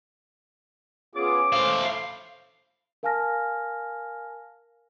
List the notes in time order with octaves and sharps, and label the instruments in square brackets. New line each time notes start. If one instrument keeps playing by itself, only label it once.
[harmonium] B3 F4 G#4 [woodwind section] C#4 D6
[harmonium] A3 C5 [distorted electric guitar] E4 F5
[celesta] A#4 F5 G#5 A5 F6 A#6